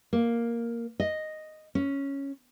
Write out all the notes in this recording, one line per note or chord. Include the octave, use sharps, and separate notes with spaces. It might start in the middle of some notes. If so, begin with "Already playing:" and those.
A#3
D#5
C#4